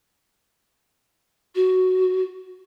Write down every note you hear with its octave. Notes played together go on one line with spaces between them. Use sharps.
F#4